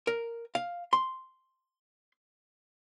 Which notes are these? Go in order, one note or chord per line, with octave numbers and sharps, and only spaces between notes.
A#4
F5
C6